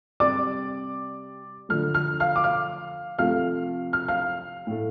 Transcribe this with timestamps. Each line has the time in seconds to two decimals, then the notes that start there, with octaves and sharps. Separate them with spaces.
0.20 C3 G3 D5 D6
1.69 D3 F3 A3 F6
1.94 F6
2.20 F5 F6
2.36 D6
2.44 F5 F6
3.18 C3 F3 A3 F5 F6
3.93 F6
4.08 F5 F6
4.67 A2 A3